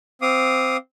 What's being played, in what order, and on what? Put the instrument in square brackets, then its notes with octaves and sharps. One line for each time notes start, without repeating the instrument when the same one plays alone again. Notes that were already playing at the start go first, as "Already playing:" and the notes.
[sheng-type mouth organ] C4 F5 D6 D#6